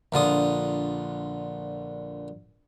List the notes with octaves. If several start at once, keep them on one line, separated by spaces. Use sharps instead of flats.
A#1 D3 F4 D#6